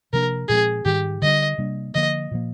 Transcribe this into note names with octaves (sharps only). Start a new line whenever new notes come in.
C3 F3 A#3 D4 A#4
A#2 F3 G#3 C4 G#4
G#2 D#3 G3 G4
D3 G3 D4 D#5
C3 G3 A#3 D4
D3 F3 A#3 D#5
A#2 F3 A#3